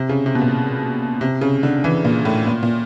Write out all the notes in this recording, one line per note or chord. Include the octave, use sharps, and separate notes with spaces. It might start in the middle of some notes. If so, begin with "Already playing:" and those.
Already playing: C3
C#3
C3
B2
A#2
C3
C#3
D3
E3
A#2
A2
A#2
A#2